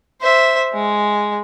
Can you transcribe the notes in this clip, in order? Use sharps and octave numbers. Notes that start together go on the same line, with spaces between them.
C5 E5
G#3